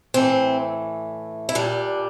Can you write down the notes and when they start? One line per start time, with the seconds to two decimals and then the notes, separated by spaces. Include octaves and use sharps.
0.14 A2 E3 A3 C4
1.49 E4
1.55 A#2 G3 D4